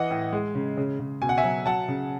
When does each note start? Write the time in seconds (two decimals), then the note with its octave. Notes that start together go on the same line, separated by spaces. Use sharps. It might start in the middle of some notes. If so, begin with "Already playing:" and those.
Already playing: E3 D#5 F#5
0.10 A2
0.32 G#3
0.55 C#3
0.77 C#3
0.99 C#3
1.22 B2 G#5
1.29 F#5
1.38 E5 G#5
1.44 F#3
1.66 F#3 F#5 A5
1.88 C#3